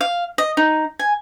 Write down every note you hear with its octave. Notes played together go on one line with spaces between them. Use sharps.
F5
D#5
D#4
G#5